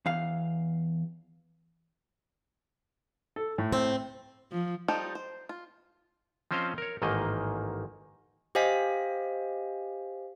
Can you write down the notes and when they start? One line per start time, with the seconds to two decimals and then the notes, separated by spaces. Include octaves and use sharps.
0.06 E2 F5
3.36 A4
3.58 A2
3.73 C4
4.52 F3
4.88 F3 G3 D#4 G4 A4
5.15 C5
5.49 F4
6.51 F3 C4 C#4 C5 D#5 F5
6.78 A#4 C#5
7.02 A1 G#2 D#3 A#3 D#5
8.55 G4 C5 D#5 F5 G#5 B6